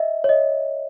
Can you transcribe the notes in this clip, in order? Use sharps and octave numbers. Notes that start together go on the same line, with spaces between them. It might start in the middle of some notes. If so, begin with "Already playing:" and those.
Already playing: D#5 E5
C#5
D#5